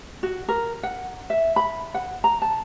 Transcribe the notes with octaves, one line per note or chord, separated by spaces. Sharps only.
F#4
A#4
F#5
E5
B5
F#5
A#5
A5